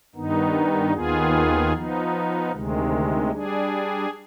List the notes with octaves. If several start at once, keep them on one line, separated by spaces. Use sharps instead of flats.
G2 D#3 B3 D#4
D#2 D#3 B3 F4 G#4
F3 B3 D#4
D2 C3 D#3 G#3
G3 D4 G#4